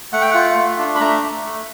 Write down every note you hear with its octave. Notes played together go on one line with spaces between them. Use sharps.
A3 F#5
G5
F4 F#5
A3
D4
B5
A3 A#5
A3
A3